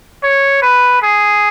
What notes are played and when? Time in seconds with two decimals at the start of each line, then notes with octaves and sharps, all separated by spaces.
0.23 C#5
0.62 B4
1.02 G#4